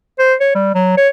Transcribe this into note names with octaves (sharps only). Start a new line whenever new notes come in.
C5
C#5
G3
F#3
C#5